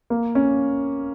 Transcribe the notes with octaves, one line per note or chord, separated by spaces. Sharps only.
A#3
C#4